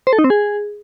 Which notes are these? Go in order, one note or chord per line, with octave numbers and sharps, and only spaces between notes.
C5
A4
D#4
C4
G#4